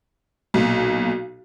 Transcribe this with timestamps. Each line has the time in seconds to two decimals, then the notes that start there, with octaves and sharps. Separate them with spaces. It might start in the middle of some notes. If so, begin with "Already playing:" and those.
0.54 B1 A#2